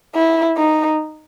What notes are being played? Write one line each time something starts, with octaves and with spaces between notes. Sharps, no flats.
E4
D#4